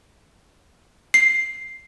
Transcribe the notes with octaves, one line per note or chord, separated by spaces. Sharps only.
C7